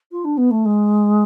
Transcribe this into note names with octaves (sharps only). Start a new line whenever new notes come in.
F4
D4
B3
A3
G#3